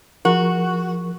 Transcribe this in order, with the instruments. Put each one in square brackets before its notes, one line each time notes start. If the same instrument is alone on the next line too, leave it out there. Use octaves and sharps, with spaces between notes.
[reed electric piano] F3 G#4 A#4 [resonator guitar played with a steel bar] F#4